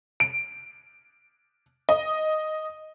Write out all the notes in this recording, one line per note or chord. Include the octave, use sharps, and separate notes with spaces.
D7
D#5